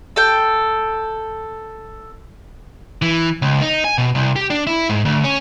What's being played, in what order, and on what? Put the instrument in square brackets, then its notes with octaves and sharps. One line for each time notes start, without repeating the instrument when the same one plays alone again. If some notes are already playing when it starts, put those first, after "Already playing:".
[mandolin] A4 G5
[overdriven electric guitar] E3
C#2
D#4
G#5
B2
C2
G4
D4
E4
G#2
D2
C#4